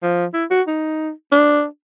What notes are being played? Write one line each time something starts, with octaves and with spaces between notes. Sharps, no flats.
F3
E4
F#4
D#4
D4